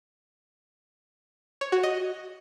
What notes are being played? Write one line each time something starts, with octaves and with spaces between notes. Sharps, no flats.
C#5
F#4
D#5